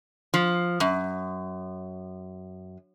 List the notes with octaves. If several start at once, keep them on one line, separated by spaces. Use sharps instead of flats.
F3
F#2